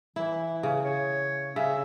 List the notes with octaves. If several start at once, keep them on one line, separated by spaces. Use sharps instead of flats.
E3 E4
C#3
C#5
C#3 E5